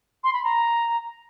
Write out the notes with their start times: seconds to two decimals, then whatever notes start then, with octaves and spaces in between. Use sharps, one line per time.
0.24 C6
0.33 B5
0.44 A#5